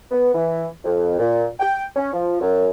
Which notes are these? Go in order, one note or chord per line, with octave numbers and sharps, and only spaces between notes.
B3
E3
F2
A#2
G5
C#4
F3
F#2